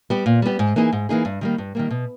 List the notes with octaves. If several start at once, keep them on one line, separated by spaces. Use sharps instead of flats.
G3 B3 G4
A#2
G3 B3 G4
G#2
E3 A#3 D#4 G#4
G#2
E3 A#3 D#4 G#4
G2
D#3 G3 A#3
G2
D#3 G3 A#3
B2